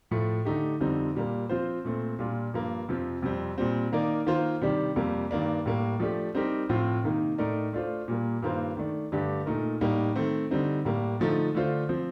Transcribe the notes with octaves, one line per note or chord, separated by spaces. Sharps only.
A2 F3 A3
D3 A3 D#4 G4
F2 D3 G3 C4 D#4
A#2 G3 A#3
F3 C4 F4 C5
A#2 A3 C4
A#2 G3 D4 F4
G2 F3 A#3
F2 C3 F3 C4
F2 C3 G3 C4
A#2 G3 C4
D#3 A#3 D#4 A#4 D5
D#3 A#3 F4 C5
C3 D#3 G3 D4 G4
F2 C3 G3 A#3
G2 D#3 A#3 D4
A2 G3 A#3
F3 A3 D4 G4
G3 C4 D#4 G4 A#4
A2 F3 C4 F4
C3 D#3 A#3 D#4
A2 A3 D#4 A#4 D5
A3 D4 F4 C5
A#2 G3 A#3
G2 D#3 A#3 F4 C5
D#3 A3 D4
G2 D3 A3 D4 G4
A#2 A3 D#4 A#4
A2 G3 A#3 D#4
D#3 A3 C4
D3 G3 C4 D#4
A2 G3 A#3
D3 F3 A3 D#4
D3 A3 D4 F4 C5
F3 C4